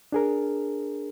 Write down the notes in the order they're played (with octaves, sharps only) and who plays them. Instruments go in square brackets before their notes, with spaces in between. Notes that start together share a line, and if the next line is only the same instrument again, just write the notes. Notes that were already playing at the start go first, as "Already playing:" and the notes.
[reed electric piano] D4 G#4 A#4